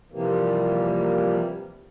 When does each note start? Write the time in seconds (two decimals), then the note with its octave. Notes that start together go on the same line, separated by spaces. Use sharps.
0.12 C3 E3 F3 G3 A#3